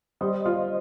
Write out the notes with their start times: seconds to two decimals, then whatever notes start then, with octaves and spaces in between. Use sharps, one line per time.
0.21 G3 C5 D#5
0.46 F4